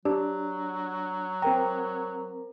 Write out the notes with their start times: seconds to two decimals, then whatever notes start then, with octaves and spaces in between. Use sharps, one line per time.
0.05 F#3 D4 G4
1.42 C4 A#4 G5 A#5